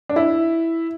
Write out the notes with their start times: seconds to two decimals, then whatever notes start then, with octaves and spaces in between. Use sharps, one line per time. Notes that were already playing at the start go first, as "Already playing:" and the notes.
0.09 D4
0.16 E4